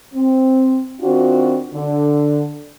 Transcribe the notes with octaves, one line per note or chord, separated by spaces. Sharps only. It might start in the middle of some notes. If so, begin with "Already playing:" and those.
C4
D#3 C4 D4 F4 F#4
D3